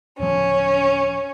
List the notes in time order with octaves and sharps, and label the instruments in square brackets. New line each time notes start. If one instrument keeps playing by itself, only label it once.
[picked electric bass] D1 F3 [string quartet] C#4